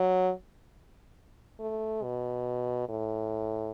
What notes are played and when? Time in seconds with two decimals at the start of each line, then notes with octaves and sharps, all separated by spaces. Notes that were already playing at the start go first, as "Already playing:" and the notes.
Already playing: F#3
1.59 A3
2.03 B2
2.89 A2